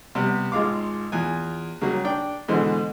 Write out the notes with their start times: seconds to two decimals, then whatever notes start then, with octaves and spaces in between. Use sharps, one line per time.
0.15 C3 G3 B3
0.52 G#1 G#3 F4 F5 D6
1.12 E2 F4 G#5
1.81 C#3 F#3 G3 A#3
2.04 D4 D5 G5
2.48 B2 D3 E3 G#3 C5